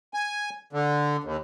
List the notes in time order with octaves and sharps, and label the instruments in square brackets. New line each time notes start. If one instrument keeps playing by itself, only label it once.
[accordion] G#5
D3
D#2